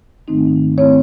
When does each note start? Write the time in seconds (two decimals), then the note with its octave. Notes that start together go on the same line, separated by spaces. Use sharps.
0.28 G#2 D#3 A3 C4 D#4
0.77 D#3 A3 C4 E4 C#5